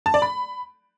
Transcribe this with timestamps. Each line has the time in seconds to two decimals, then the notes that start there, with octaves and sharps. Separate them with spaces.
0.06 A5
0.14 D5
0.22 B5